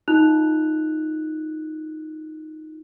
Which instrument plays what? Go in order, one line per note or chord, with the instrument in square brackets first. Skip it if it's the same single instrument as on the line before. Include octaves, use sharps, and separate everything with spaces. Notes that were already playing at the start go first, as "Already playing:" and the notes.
[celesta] D#4 F4 F#6 F7